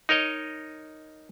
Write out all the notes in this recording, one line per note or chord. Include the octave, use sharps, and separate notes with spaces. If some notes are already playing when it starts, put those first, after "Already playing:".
D#4 A#4 C#5 D#5